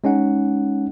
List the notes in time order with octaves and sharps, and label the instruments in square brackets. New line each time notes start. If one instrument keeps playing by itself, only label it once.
[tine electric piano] G#3 C#4 D#4 F#5